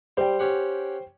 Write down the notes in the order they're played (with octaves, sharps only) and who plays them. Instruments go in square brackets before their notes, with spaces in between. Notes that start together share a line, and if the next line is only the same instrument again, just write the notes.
[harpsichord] G3 [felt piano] C5 G5
[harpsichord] C#4 G4 F#5